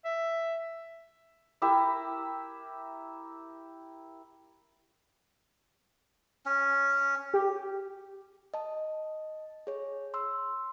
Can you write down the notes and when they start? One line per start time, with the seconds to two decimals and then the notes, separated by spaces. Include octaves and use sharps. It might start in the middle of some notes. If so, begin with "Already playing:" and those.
0.05 E5
1.62 E4 G4 A#4 E5
6.46 C#4
7.34 G4
8.54 D#5 A5
9.67 G#4 C#5
10.14 C6 E6